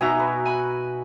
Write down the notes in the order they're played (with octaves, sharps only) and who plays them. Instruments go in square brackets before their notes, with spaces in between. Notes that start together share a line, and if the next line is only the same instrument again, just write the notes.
[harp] B2 D#4 A#5 [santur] F#4 E5 G#5
[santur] B4
[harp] G#5 B5 F#6